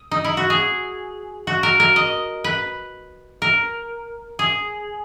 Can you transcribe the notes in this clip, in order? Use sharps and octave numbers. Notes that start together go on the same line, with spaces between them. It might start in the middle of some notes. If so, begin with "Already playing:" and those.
Already playing: C#4
D#4
E4
F#4
G#4
F#4
A#4
A#4
D#5
B4
A#4
G#4